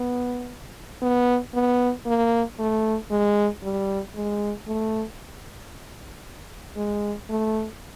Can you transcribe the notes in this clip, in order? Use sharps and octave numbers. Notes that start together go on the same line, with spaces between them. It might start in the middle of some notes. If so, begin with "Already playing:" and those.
Already playing: B3
B3
B3
A#3
A3
G#3
G3
G#3
A3
G#3
A3